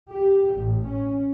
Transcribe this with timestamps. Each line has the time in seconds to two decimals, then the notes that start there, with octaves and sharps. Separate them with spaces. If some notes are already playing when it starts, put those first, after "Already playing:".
0.10 G4
0.54 A1
0.87 C#4